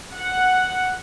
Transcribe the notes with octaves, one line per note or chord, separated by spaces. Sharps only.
F#5